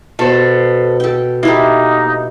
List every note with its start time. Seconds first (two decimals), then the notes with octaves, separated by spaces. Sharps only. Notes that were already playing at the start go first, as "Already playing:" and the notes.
0.19 B2 A4 C5
1.00 A4 G5
1.43 A#3 D#4 E4 G4 A4